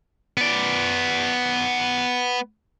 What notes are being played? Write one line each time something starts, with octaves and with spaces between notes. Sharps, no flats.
B3 D5